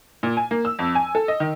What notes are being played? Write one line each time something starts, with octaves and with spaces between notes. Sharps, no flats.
A#2
G#5
A#3
E6
F2
G#5
A4
D#5
D#3